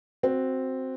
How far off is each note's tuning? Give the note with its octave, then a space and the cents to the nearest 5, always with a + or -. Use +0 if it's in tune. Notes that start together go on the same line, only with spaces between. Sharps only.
C4 +0 F#4 +0